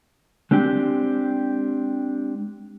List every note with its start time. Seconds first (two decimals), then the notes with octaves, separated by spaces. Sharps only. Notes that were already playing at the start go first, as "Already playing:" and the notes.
0.51 G#3 C4 D4 G4